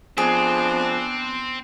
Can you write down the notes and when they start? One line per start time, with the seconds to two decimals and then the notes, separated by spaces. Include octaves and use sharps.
0.18 F3 B3 C4 D4 G#4